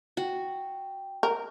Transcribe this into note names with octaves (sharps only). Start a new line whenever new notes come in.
F#4 G5
A#4